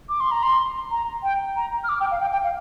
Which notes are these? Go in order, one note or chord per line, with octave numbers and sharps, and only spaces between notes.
D6
C6
A#5
C6
A#5
G5
A#5
F6
D6
G5
F5
G5
G5
F5